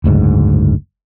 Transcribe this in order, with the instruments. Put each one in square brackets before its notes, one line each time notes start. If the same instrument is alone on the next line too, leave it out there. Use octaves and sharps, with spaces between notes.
[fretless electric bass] F#1 D2 G#2